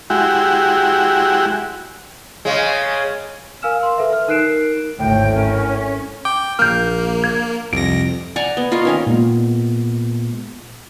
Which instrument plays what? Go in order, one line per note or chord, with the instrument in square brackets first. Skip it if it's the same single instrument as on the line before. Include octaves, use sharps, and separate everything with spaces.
[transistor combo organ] G#3 E4 F#4 G4
[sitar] C#3 G#3
[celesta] A#4 F5 G#5 E6 F6 E7
C6
A4 B4 E5
F6
D#4 A#4 F#6 C7 D7 E7
[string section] G#1 D2 [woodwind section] A2 [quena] G5
[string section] C#4 [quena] A#4
[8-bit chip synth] G5 [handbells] D6
[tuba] A#1 [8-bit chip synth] A#3 [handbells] F6 G6
[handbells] G#6
[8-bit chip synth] C2 A#6 [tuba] F2 [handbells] D7
[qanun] D5 F#5 G#5 A#5
B3
F4 A#4 C#5 D#5
D#3 C#4 A#4
[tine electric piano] A#2 G#3 B3